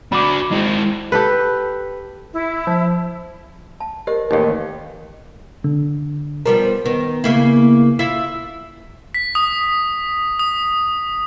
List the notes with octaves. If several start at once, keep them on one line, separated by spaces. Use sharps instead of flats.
D4 F#4 B5 D6
G#3 C4 E4 D#5
G4 A4 B4
E4
F3
A5
G4 A#4 C5 D#5
A1 D#2 D#4 G4 D#5
D3
F3 G3 B3 A#4
D#3 B3
C#3 A#3 E4
E4 F4 E5
B6
D#6
D#6